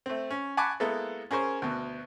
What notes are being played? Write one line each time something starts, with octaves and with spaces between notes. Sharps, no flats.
A3 C4
C#4
F#5 G#5 A5 B5 C#6 D6
G#3 A#3 B3 E4 A4
C#4 G#4 A#4 C5 C#5
D2 B2